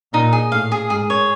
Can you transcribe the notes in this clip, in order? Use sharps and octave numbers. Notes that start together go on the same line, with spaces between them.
A#2 D#4
G#4
A2 F5
G#4
G#2 G#4
C#5